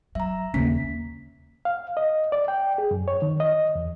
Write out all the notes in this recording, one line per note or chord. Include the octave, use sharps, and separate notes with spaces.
F#3 E5 A#5
D#2 C#3 A#3 C#4 B6
F5
D#5
D5
G5
G#4
F#2
C#5
D#3
D#5
E2